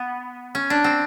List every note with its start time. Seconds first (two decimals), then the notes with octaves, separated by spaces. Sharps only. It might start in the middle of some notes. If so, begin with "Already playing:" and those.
Already playing: B3
0.55 C#4
0.70 D4
0.84 C4